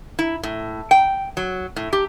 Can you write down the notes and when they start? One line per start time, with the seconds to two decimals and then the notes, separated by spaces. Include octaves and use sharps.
0.19 E4
0.43 A2
0.91 G5
1.37 F#3
1.76 A2
1.93 G4